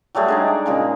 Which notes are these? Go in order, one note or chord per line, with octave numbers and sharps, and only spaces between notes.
F#3 G3 A3 G#4
G#3 D4 D#4
G5
A#2 C#3 G#3